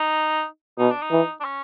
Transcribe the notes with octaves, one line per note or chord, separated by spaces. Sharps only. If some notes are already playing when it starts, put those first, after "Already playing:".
Already playing: D#4
B2 D#4
D4
D#4
E3
D4
C#4